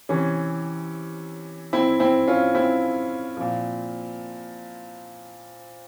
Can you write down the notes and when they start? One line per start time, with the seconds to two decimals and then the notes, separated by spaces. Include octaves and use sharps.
0.09 C3 E3 C#4
1.73 C4 E4
2.00 C4 E4
2.27 C#4 F4
2.55 C4 E4
3.37 A#2 F3